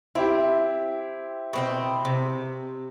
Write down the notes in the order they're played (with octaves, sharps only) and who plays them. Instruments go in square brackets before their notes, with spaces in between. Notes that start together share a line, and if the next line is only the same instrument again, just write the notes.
[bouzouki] C4 [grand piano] E4 G4
[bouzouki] B2 C4 G5
C3